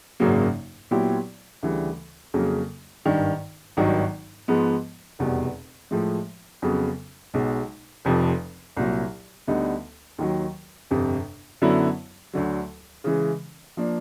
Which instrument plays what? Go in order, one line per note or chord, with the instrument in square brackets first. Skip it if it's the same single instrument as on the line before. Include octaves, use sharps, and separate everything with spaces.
[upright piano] G#1 F#2 C#3 F#3 A#3
A#2 F#3 B3 E4 G4
D2 C#3 E3 G3
F2 C#3 F#3 A#3
G#1 G2 D#3
G#1 G2 D#3 F#3
G#2 F3 G#3 B3
F1 E2 B2 G3
A2 F3 G#3
F2 C#3 F#3 B3
B1 B2 G#3
F1 F2 C3 F3
C2 A#2 F#3
D2 D3 G3 B3 D#4
D#2 D#3 F#3
G1 F2 C3
F#2 D3 F#3 B3 E4
D2 D3 F#3
C#3 E3 G#3
F3 A#3 D4